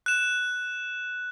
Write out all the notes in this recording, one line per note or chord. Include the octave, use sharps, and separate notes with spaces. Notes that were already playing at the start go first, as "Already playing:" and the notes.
F#6 E7